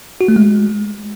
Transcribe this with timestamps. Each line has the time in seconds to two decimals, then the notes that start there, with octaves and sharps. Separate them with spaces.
0.21 F#4
0.28 A3
0.36 G#3